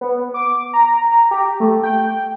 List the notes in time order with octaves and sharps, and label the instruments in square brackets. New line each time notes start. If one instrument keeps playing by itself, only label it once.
[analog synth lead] B3
D6
A#5
G4
A3
G5